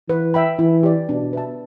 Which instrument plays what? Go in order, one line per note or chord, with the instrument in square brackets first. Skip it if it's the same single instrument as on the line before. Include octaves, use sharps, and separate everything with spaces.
[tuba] E3 [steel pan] B4
[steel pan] E5 G5 B5
[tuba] E3 [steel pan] E4
[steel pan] G4 D5
[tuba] B2 [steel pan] D4
[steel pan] B4 E5 A5